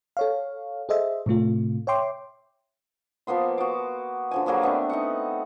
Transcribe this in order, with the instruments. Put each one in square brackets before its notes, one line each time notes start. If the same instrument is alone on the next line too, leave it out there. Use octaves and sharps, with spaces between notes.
[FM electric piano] A4 C#5 F5
G#4 A4 C5 D#5 E5
A2 C3 A3 F4
C#5 E5 G5 C6 D6
[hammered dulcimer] F3 A#3 B3 C6
F#4 D6
D3 F3 G#5
F#3 A#3 G#4 B4
A3 B3 C4 D4
D#4 E5 F#5